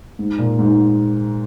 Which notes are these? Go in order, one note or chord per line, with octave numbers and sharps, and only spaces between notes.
G#2
A#2
G#2